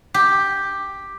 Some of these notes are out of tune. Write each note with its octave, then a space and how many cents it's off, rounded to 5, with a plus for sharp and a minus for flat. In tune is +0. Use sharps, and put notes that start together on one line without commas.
G4 +5